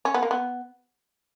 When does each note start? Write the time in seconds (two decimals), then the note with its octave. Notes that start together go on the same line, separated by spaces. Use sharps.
0.05 C#4
0.14 B3
0.22 A#3
0.31 B3